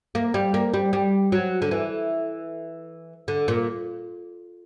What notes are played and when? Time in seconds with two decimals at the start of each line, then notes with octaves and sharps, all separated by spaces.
0.15 A#3
0.34 G3
0.54 A#3
0.74 G3
0.93 G3
1.32 F#3
1.62 D3
1.71 E3
3.28 D3
3.48 A#2